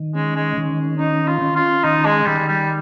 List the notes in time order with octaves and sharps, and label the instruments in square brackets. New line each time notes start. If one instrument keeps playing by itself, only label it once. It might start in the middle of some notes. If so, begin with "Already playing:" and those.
Already playing: [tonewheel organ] D#3
[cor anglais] G#3 [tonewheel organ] C#4
[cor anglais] G#3
[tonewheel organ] D#3
[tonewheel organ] C#4 [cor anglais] D#4
[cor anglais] F4
[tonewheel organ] C#4
[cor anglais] F4
[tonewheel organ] D#3 [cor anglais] D#4
[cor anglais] G#3
[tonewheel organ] D#3 [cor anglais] G3
[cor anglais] G3